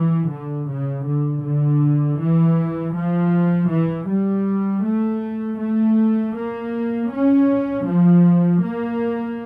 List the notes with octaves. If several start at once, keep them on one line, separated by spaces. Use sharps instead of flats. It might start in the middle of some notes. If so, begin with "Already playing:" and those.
Already playing: E3
D3
C#3
D3
D3
E3
F3
E3
G3
A3
A3
A#3
C#4
F3
A#3